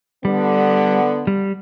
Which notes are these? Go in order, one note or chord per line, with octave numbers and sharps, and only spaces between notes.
D3 G3 B3
G3